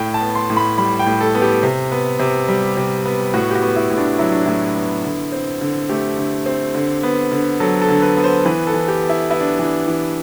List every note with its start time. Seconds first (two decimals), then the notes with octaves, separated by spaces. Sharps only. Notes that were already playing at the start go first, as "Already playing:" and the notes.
Already playing: A2 G5
0.14 A5
0.21 B3
0.35 C6
0.50 A2
0.57 B5
0.78 G3 B5
0.99 G5
1.06 A2
1.21 A4
1.35 B3
1.42 G4
1.63 C3
1.92 B3
2.19 C3
2.48 G3
2.77 C3
3.05 B3
3.34 A2 F#4
3.51 G4
3.55 F#4
3.62 B3
3.76 E4
3.90 A2
3.98 D4
4.19 F#3 E4
4.32 D4
4.45 A2 E4
4.76 B3
5.04 D3
5.32 C4
5.61 D3
5.89 A3 G4
6.18 D3
6.46 C4
6.75 D3
7.03 B3
7.32 D3
7.60 F#3 A4
7.82 A4
7.88 D3
8.02 B4
8.17 B3
8.24 C5
8.45 E3 B4
8.67 A4
8.73 E3
8.88 G4
9.02 B3
9.09 E4
9.30 B3 E4
9.40 D4
9.59 E3 D4
9.88 E3